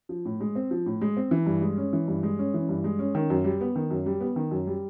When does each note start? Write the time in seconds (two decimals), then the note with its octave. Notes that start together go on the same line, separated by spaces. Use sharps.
0.09 F3
0.25 A2
0.40 G#3
0.55 C4
0.71 F3
0.86 A2
1.01 G#3
1.17 C4
1.31 E3
1.46 G2
1.62 G#3
1.77 C#4
1.93 E3
2.08 G2
2.23 G#3
2.39 C#4
2.54 E3
2.69 G2
2.84 G#3
2.99 C#4
3.15 D#3
3.30 F#2
3.44 G3
3.61 B3
3.76 D#3
3.91 F#2
4.06 G3
4.20 B3
4.36 D#3
4.51 F#2
4.67 G3